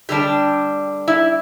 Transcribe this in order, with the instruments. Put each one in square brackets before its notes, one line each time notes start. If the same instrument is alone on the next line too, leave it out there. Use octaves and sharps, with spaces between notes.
[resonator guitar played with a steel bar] D3 G3 D4 G4
E4